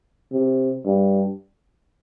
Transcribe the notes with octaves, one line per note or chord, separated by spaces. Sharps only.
C3
G2